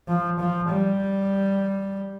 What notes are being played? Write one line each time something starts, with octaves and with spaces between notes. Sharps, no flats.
F3
F3
G3